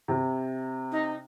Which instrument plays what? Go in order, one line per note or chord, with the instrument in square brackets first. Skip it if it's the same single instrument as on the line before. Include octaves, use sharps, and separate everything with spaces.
[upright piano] C3
[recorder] D#4